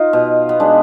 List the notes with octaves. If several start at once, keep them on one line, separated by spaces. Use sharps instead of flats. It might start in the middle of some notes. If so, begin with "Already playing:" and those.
Already playing: D#4 F4
B2
B3
G#3 D4